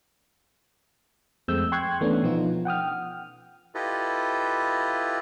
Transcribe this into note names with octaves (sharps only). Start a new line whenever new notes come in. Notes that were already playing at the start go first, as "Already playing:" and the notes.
F2 G#3 A3 C4 E6 G6
G5 C6 C#6 F#6 G#6
E3 A3 B3 C#4 D4
B2 F3 B3 D#4 F4
F#5 G5 D#6 F6
E4 F4 G4 A4 B4 D#5